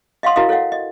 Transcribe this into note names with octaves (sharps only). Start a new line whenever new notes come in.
D#5 F5 F#5 C6 D#6
E4 F#4 A#4 D#5 F5 D#6
A4 C#5 D#5 F5 F#5
D#5